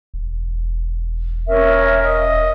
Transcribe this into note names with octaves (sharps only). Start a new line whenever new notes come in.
E1
C#4 A#4 E5
D#5